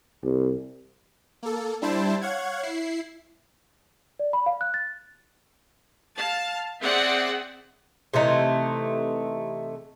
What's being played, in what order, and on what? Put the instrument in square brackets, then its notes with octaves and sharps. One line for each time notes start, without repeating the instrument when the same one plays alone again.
[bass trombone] C2
[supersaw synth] A#3 A4
G3 D4 E4 C5 A5
C#5 F5 F#5 G#6
E4 C7
[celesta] D5
B5
F5
F#6
A6
[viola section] F5 A5
C4 G#4 D5 E5 F#5
[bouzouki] C3 E3 A3 D#4